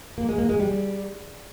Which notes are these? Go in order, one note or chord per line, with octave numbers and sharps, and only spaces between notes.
A#3
G#3
A#3
G#3
G3